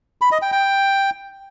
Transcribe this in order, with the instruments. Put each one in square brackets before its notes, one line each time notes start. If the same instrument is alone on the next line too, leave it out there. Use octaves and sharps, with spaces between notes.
[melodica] B5
D#5
G5
G5